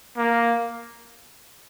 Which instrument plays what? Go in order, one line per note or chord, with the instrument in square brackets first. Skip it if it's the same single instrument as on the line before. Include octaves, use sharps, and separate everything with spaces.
[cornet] A#3